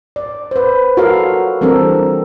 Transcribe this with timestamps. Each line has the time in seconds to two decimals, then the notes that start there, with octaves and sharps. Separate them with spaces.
0.16 D5
0.51 B4 C5
0.97 F4 F#4 A4 A#4 C#5 F5
1.61 E3 G3 C4 D4 A4 A#4